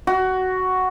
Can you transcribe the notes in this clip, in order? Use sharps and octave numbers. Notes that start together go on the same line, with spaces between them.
F#4